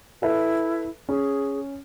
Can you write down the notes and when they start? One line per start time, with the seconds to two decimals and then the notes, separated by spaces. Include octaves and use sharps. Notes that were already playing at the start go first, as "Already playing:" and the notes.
0.22 E4 A4 B4 E5
1.09 C#4 G#4